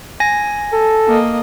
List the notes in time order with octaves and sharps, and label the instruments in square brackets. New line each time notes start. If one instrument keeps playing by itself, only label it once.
[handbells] G#5 A#6
[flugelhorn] A4
[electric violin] A#3 D#5